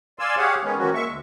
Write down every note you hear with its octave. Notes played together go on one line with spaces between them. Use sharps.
D5 F5 G#5 C6 E6
G4 G#4 C#5 F5 F#5
D#3 G#3 B3 C#4
E3 F3 G3 A#3 C#4 F#4
G#3 A#3 E5 C#6
D2